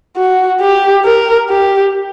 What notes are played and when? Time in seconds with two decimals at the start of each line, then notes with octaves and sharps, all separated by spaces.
0.17 F#4
0.61 G4
1.05 A#4
1.49 G4